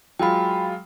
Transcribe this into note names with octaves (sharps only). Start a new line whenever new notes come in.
F#3 G#3 F4 G5 B5